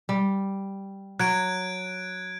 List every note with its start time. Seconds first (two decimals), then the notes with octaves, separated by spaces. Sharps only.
0.09 G3
1.20 F#3 F#6 G#6 D7